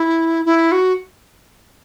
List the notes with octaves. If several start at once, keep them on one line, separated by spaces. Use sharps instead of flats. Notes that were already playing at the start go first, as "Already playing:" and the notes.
Already playing: E4
E4
F#4